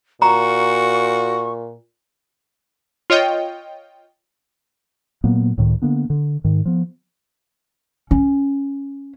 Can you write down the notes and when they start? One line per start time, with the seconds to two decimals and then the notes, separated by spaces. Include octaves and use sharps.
0.22 A#2 F#4 A#5 C#6
3.10 F4 C#5 D#5 G5
5.24 A#2 F#3 A#3 B3
5.58 C#2 A2 D#3
5.82 D3 A#3 B3 D4
6.10 D3
6.44 G#2 D#3
6.66 F3 B3
8.11 C#4